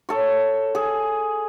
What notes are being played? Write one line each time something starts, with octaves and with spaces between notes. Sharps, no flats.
A4 C#5
G#4